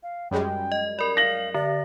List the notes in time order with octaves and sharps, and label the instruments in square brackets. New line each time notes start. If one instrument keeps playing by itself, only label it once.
[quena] F5
[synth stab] F#2 G3 G#3 [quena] G5
[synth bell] D#5
[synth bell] A#4 D5 [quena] B5
[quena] F5 [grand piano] A#6 F#7
[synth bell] D3 [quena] D5